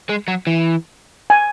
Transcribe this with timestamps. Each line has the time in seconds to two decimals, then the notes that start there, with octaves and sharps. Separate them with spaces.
0.09 G#3
0.28 F#3
0.47 E3
1.30 G#5